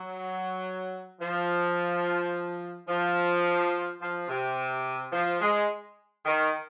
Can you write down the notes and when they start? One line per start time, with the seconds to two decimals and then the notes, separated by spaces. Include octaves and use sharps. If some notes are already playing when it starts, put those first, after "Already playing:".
Already playing: F#3
1.20 F3
2.88 F3
4.00 F3
4.28 C3
5.12 F3
5.40 G#3
6.25 D#3